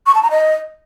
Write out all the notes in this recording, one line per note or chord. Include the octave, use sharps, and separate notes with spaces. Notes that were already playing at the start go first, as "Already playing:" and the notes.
C#6
A5
A#5
D#5